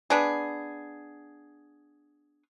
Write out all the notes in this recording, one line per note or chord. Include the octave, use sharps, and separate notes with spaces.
B3 D4 G#4